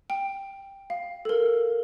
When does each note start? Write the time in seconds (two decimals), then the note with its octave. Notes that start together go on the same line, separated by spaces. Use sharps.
0.10 G5
0.90 F5
1.25 A4
1.29 A#4